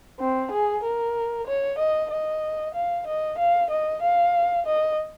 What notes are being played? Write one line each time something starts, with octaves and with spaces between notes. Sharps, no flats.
C4
G#4
A#4
C#5
D#5
D#5
F5
D#5
F5
D#5
F5
D#5